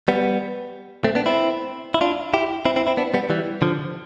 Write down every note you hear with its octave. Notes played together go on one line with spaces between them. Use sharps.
G3 B3
A3 C4
B3 D4
C4 E4
E4
D4 F4
E4 G4
C4 E4
C4 E4
C4 E4
B3 D4
G3 B3
E3 G3
D3 F3